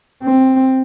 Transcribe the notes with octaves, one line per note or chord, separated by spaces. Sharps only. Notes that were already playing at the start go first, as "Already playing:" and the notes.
C4